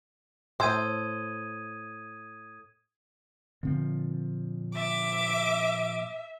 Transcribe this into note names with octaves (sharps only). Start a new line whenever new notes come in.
A2 A4 C5 D#6 G#6 D#7
A#2 D3 F3 C4
E5 D6